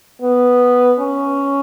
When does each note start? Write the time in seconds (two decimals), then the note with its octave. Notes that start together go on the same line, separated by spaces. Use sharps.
0.21 B3
1.00 C#4